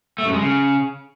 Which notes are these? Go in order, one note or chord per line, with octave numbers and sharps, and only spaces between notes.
A3
F#2
G#3
C#3